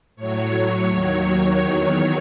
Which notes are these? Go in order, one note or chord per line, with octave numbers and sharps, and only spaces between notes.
A2 F#3 C#5
D#2 D#3 F#3 C#5
E2 D#3 F#3 C#5